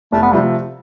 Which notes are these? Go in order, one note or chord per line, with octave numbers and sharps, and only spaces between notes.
F1 A3
B3
C3 F3 G3 A3